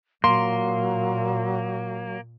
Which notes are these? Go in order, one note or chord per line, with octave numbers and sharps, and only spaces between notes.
A#2 F#3 A#3 C6